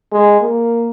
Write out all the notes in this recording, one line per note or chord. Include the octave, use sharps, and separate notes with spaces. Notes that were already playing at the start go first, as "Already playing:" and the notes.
G#3
A#3